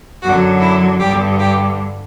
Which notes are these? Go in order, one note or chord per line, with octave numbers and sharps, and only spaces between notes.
F#2 D3 F#3 F#4
E4
G2 D3 G3 G4
G4